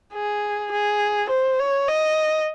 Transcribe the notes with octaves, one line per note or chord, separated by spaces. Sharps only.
G#4
G#4
C5
C#5
D#5